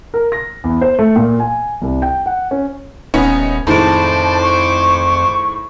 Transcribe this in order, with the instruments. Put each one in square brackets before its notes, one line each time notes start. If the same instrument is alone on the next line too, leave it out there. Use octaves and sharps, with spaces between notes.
[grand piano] A#4
A#6
E2
C5
A3
A#2
G#5
C2
G5
F#5
C#4
[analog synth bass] D#1 [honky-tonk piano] B3 C#4 D#4
[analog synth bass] F2 [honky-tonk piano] A2 D#3 G#3 [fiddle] C5 D6 [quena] A5
[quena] C#6